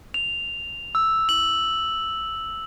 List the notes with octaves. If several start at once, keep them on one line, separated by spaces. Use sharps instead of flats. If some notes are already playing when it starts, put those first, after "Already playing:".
F7
E6
F#7